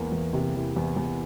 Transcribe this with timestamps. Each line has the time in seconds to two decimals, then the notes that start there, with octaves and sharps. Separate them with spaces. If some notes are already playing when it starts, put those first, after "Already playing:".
Already playing: E2 E3 A#3
0.12 E2
0.33 C3
0.55 E3
0.76 E2
0.97 E2